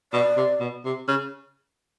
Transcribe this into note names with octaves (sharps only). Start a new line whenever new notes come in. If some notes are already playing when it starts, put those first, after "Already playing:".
B2 D5
C3
B2
C3
C#3